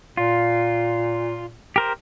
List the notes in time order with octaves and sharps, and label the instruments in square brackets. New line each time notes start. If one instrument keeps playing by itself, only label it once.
[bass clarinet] A#2 [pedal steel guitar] F4
[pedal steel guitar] G4 A#4 C5